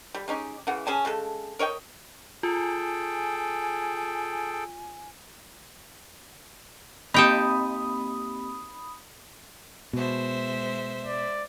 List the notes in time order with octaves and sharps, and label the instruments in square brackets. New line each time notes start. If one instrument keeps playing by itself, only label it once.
[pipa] G3
G#3 C#4 D#4 G4
C#3 E3 F#5
C#4 G#4 G#5 A5
C#3 G#3 A4
A#4 C#5 D#5 G5
[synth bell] F4 [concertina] G#4 A4 G5 [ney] G#5
[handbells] A#3 C4 G4 [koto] D#4 G5 A5 [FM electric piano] B5 D#6
[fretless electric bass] B2 [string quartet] G#3 C5 E5
[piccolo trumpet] D5